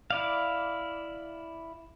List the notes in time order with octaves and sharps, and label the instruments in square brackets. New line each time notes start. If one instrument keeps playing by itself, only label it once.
[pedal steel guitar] E4 D5 F5